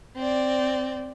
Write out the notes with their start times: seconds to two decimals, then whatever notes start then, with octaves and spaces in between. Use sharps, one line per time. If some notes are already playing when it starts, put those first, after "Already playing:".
0.16 C4 D5